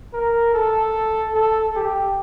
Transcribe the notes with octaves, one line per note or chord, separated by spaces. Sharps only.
A#4
A4
A4
G4